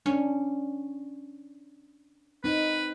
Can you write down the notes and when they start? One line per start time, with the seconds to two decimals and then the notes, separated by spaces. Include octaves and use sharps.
0.06 C#4 D4
2.44 C4 D#4 B4